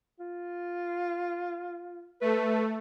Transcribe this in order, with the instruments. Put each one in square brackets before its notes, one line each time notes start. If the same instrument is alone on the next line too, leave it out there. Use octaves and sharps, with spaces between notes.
[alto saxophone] F4
[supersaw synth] A3 [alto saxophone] B4